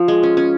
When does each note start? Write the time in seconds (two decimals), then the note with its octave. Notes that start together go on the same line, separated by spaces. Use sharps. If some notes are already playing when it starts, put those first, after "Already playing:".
Already playing: F3
0.08 G#3
0.23 C#4
0.37 C#4